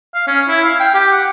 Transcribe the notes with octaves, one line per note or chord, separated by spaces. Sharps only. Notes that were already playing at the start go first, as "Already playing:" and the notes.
F5
C#4
E4
F5
G5
G4
F#5